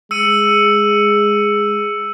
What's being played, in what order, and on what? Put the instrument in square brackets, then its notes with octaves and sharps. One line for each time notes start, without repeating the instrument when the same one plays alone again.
[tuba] G#3 [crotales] E6 C#7 D#7